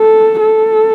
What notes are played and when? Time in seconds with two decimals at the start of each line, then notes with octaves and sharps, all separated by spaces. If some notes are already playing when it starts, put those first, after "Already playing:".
Already playing: A4
0.40 A4